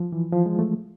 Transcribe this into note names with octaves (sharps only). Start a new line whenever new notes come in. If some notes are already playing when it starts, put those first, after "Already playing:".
Already playing: F3
E3
F3
G#3
A3